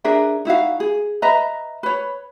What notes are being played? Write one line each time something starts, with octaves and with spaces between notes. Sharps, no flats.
D4 G#4 A#4 E5
D#4 E4 F#4 F5
G#4
B4 D#5 E5 A#5
B4 C#5